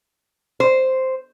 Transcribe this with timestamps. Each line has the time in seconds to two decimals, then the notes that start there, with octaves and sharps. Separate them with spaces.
0.60 C5